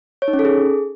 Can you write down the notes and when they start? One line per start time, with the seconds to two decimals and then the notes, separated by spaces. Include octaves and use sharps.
0.22 C#5
0.28 D#4
0.33 C#4
0.39 A4
0.45 G#4